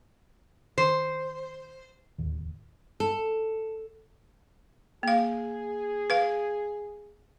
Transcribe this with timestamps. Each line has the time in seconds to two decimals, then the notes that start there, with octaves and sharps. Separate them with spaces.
0.78 D#3 C5
2.18 D1 D#2
3.00 A4
5.03 A#3 G#4 F5
6.10 B4 F5